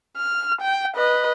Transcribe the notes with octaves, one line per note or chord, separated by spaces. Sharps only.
F6
G5
B4 D#5